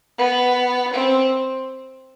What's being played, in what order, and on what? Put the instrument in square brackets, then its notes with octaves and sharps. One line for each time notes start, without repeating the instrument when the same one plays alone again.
[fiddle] B3
C4